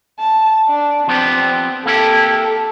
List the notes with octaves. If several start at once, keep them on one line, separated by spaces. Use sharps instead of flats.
A5
D4
F3 B3 C4 G4
A#3 E4 G4 A4